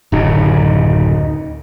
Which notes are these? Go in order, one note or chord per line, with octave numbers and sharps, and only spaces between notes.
D1 F#2 C#3 D#4